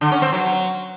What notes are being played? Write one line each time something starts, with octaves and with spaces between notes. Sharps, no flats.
D3
C#4
C4
F#3